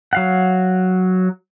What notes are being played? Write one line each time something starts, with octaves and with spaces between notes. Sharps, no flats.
F#3 F5 F#5